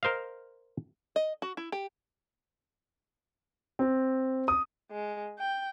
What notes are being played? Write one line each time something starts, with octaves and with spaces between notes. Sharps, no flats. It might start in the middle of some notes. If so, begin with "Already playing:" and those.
A#4 C5 D#5 F5
D#5
F#4
E4
G4
C4
D#6
G#3
G5